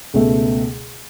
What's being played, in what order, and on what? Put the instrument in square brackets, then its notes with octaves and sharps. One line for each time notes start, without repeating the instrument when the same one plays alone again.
[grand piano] C#2 B2 A3